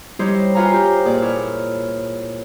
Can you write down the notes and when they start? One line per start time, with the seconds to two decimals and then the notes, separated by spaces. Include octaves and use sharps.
0.19 G3 D#4 E4 G4 C5 C#5
0.55 F4 B4 C#5 F5 G#5 A#5
0.73 F4 G4 C5
1.05 A#2 G#4 D5 D6
1.22 E4 C#5 C#6 F6